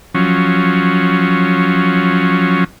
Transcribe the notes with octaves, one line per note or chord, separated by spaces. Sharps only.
F3 F#3 C#4